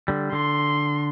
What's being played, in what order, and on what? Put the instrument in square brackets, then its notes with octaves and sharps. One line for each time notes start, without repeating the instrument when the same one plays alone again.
[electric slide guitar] D3 G3
[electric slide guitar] D3 [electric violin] C6